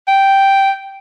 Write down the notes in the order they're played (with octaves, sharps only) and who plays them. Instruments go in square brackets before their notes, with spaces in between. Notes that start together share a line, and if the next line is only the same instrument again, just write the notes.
[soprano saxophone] G5